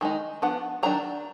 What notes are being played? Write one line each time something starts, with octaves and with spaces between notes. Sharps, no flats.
D#3 G#3 D#4
F3 B3 D4 F#5
D#3 F#3 D4 A#5